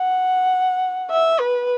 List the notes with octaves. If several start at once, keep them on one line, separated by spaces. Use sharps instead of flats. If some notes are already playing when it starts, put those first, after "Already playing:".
Already playing: F#5
E5
B4